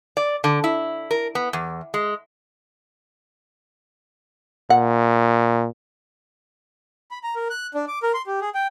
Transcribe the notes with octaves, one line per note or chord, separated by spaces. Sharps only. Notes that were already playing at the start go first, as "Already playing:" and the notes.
D5
D3
E4
A#4
B3
E2
G#3
A#2 F#5
B5
A#5
A#4
F#6
D4
D6
A#4
C6
G4
G#4
G5